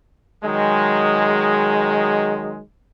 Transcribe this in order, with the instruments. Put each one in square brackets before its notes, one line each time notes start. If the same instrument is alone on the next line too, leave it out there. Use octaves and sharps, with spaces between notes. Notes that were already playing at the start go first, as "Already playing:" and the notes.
[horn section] D#3 F#3 G#3